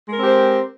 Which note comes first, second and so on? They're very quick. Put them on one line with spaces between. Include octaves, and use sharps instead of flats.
G#3 A#4 C4 G4 C5